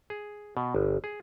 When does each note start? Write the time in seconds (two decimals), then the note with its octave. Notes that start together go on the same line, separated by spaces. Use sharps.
0.10 G#4
0.57 B2
0.75 G1
1.04 G#4